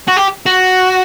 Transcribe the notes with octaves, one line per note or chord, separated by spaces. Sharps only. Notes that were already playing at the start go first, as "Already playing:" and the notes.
F#4
G4
F#4